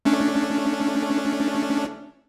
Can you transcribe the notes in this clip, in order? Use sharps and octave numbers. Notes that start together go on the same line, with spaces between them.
A3 C#4 D4